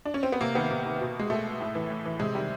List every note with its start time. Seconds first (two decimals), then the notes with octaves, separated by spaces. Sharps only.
0.05 D4
0.14 C#4
0.23 C4
0.32 B3
0.41 C3 A#3
0.55 D#3 B3
0.71 C3 A#3
0.85 D#3
1.01 B2
1.19 G#3
1.30 B2 A3
1.60 A2
1.75 E3
1.90 A2
2.05 E3
2.20 C3 G#3
2.35 D#3 G3